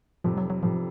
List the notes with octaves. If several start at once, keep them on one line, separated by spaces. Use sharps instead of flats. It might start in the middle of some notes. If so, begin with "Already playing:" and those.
F1 F2 C3 F3
G3
F#3
F#3
F1 F2 C3 F3